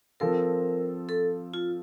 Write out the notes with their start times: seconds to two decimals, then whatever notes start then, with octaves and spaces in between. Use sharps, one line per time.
0.20 F3 C4 F4 A4 A#4
1.09 A4
1.54 F4